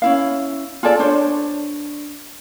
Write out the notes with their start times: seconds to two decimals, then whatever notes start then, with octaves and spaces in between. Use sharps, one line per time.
0.02 C#4 E4 F5
0.83 F4 G#4 A4 D5
0.99 D4 C5 C#5